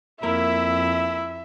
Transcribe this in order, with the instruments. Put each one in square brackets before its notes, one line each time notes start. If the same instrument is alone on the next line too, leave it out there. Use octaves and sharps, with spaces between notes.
[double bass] F2 [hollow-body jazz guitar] A#3 A#4 [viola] E4 [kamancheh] E5